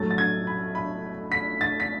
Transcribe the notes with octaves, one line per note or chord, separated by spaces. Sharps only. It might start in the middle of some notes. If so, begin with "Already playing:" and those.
Already playing: A2 F#3 A3 A6
A6
G#6
B5
B5
B6
A6
B6